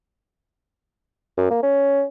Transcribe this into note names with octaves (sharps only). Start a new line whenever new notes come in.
F#2
A#3
C#4